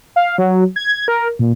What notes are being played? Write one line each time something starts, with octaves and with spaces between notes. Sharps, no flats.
F5
F#3
G#6
A#4
A#2